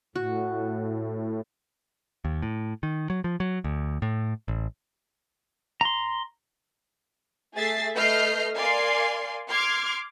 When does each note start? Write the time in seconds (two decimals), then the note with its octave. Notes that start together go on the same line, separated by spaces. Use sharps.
0.16 A2 F#4
2.25 D#2
2.42 A2
2.83 D#3
3.10 F#3
3.24 F3
3.40 F#3
3.64 D2
4.02 A2
4.48 A1
5.81 A#5 C6
7.55 A3 G#4 E5 A6 C7
7.96 A3 B4 D#5 F6 G6 C7
8.55 A#4 D5 F5 G#5 C6 C7
9.48 C6 D6 F6 G#6